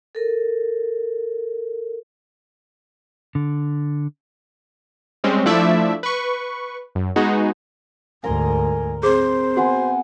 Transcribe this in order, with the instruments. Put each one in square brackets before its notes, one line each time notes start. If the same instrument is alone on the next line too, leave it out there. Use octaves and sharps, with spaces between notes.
[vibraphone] A4 A#4
[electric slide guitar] D3
[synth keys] G3 G#3 C4 C#4
F3 A3 D4 E4 D5 E5
B4 C#6
F#2
G#3 B3 D#4 F#4 G#4
[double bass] D2 G#2 [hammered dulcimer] A#4 A#5 C6 [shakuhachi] G#5
[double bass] C4 [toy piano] G#4 [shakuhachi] C5
[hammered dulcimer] B3 F#5 G#5 [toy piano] F#4